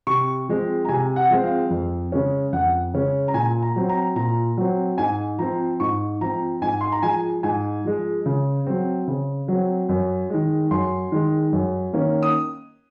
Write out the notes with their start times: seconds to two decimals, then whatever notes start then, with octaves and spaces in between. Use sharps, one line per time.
0.07 C3 C#6
0.49 F3 G#3 C4
0.85 A#5
0.89 C3 G#5
1.16 F#5
1.30 F3 G#3 C4
1.44 F5
1.70 F2
2.12 C#3 G#3 C#4
2.52 F2 F#5
2.94 C#3 G#3 C#4
3.28 A#5
3.34 A#2 G#5
3.62 A#5
3.76 F#3 C4
3.89 A#5
4.16 A#2 A#5
4.57 F#3 C4
4.98 G#2 G#5
5.39 F3 C4 A#5
5.80 G#2 C#6
6.21 F3 C4 A#5
6.62 G#2 G#5
6.81 C6
6.92 A#5
7.03 F3 G#3 G#5
7.43 G#2 G#5
7.85 F3 G#3
8.26 C#3
8.67 F#3 C4
9.08 C#3
9.48 F#3 C4
9.89 F#2
10.30 D#3 G#3
10.71 F#2 C6
11.12 D#3 G#3
11.52 F#2
11.93 D#3 A#3 C#4
12.23 D#6